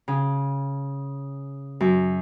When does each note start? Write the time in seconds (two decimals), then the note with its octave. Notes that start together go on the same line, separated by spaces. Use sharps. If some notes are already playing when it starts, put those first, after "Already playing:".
0.08 C#3
1.80 F#2